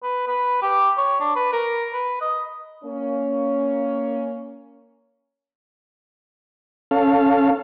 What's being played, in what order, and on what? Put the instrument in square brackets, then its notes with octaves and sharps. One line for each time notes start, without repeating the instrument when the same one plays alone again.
[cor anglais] B4
B4
G4
C#5
D4
B4
A#4
B4
D#5
[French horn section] A#3 C#4
[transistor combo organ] C#4 A4 F5